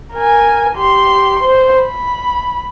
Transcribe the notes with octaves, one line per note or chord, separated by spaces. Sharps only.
A#4 G#5
G4 C6
C5
B5